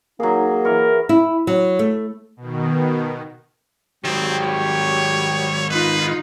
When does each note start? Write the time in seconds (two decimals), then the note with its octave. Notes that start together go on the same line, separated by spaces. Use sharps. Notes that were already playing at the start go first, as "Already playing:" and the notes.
0.20 F#3 A#3 D#4 G#4
0.65 E3 A#4 C#6
1.09 E4
1.47 F#3
1.79 A3
2.37 B2 D#3
4.04 G#2 D#3 F#3 G3 C4 G4
4.44 C#5
5.70 D#4 F4 B4